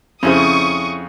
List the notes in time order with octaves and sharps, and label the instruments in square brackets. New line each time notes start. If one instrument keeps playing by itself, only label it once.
[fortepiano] F2 C#3 [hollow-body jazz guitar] C#4 E4 C5 [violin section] C#6 D#6